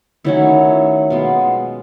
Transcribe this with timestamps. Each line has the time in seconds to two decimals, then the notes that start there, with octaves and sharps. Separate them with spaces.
0.25 D#3 F#3 A3 C#4 E4
1.10 B2 G#3 B3 F4